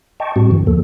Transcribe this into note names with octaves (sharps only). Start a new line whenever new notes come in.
D#5 G5 A5 C#6
A2 G3 C4 F#4
G2 D3 E3
D#2 F3 A#3 A4